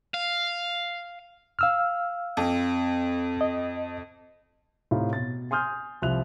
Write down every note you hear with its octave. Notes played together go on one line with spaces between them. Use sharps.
F5
F5 E6 F6
F2
D#5
A2 C3 D#4 F4
B2 A6
G#5 C6 D#6 F6 G6
C2 F3 E5 F#6 F7